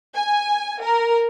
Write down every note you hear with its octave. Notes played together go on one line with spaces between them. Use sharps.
G#5
A#4